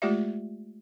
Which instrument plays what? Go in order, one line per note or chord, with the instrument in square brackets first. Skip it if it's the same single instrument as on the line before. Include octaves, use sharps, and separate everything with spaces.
[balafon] G#3 A3 F4 G4 D5 E5